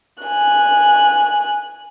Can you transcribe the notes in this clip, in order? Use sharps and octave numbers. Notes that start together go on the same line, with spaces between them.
G#5 F#6